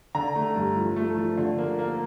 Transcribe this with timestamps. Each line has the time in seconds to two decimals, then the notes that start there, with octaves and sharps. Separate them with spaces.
0.15 D3 A#5
0.36 A3
0.55 G2
0.77 F3
0.96 A3
1.17 F3
1.37 D3
1.58 A#3
1.79 A#3